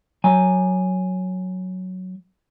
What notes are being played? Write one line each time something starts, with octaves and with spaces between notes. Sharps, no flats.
F#3 G#5